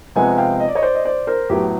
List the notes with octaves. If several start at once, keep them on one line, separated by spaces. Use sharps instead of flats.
C3 F3 G#3 B3 F#5 G#5
F5 G5
D#5
D5
C#5 D#5
C5 D5
D#5
C5 D5
A#4 C5
A2 F#3 B3 G4